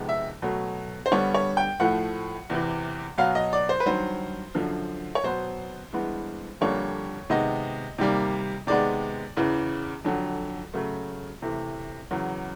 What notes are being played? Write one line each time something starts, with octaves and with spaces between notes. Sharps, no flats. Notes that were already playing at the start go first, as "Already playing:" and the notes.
Already playing: F2 C3 D#3 G#3 B3
E5
B2 F#3 A3
C5
G2 D3 G3 B3 C#5
C#5
G5
A2 F3 A3 F#5
E2 C3 E3
B2 F#3 B3 F5
D#5
D5
C5
B4
G2 D#3 F#3 C5
F#2 D3 F3
C#5
B2 F#3 B3 C5
G2 E3 G#3 B3
F2 D3 G3 A#3 C#5
C3 D#3 G#3 B3 D#5
C3 D#3 G3 A#3
C3 D#3 G#3 B3 D5
E2 C#3 E3
F2 D3 F#3
C#3 F#3 A3
C3 E3 A3
E2 C#3 F#3